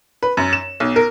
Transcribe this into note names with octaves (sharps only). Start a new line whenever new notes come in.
B4
F#2
E7
B1
A#4